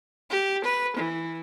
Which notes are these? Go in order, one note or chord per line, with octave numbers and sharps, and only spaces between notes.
G4
B4
E3